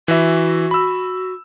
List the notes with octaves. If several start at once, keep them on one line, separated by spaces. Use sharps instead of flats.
E3 F#4 E5
B5 E6